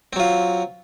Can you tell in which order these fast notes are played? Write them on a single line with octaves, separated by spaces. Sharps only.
C4 F#3 F4